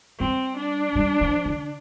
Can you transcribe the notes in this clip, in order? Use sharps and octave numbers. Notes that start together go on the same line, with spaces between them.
G3 C4
D4
G3
F3
D3